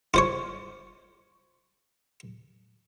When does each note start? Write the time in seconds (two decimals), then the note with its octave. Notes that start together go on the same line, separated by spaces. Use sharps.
0.14 F4 C5 C#5